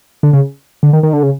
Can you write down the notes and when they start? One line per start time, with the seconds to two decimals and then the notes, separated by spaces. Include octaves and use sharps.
0.23 D3
0.33 C#3
0.83 D3
0.93 D#3
1.03 D#3
1.13 D3
1.23 C#3